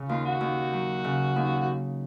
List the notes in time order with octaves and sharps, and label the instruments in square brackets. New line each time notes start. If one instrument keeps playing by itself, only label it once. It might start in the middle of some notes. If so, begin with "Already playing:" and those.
Already playing: [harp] C#3
[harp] D#2 [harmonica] F4
[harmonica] F#4
[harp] D#2
F#3
C#3
D#2
[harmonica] F#4